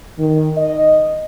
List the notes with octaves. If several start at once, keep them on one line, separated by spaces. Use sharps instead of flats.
D#3
D#5